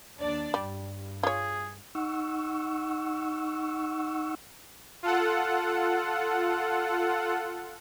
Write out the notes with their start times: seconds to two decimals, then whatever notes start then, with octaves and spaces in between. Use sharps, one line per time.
0.18 D#2 D4 D5
0.54 G2 G3
1.23 F4 G#4 C#5
1.95 D#4 F#5 C#6 E6
5.03 F4 A4 F#5